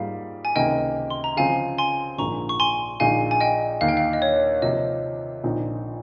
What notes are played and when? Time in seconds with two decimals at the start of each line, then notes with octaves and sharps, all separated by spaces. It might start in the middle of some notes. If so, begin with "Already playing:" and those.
Already playing: G#2 G3 A#3 F4 F5
0.45 G#5
0.56 C#2 C3 D#3 A#3 D#5 G5
1.10 C6
1.24 A#5
1.37 C#3 F3 C4 F5 G#5
1.78 G#5 C6
2.18 A#1 G#2 F3 A#3 A#5 C#6
2.49 C#6
2.60 G#5 C6
3.00 A#1 A#2 G#3 D#4 F5 G#5
3.31 G#5
3.41 D#5 G5
3.81 D#2 D#3 A#3 F5
3.89 G5
3.97 F5
4.13 D#5
4.22 C#5
4.62 C3 F3 A#3 D#5
5.43 A#1 A#2 F3 C4 D#4